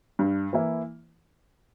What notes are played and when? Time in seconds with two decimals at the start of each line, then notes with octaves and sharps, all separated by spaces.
0.19 G2
0.53 E3 A#3 E4